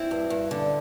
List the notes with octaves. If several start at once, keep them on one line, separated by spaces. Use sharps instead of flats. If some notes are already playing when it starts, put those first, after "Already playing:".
Already playing: C4 E4
G2
G2
D3